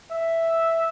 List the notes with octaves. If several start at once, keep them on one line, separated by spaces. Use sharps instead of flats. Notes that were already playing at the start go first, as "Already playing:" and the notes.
E5